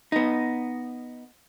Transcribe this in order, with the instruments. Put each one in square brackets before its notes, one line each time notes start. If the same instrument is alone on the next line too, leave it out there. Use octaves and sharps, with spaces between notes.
[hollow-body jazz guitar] B3 D#4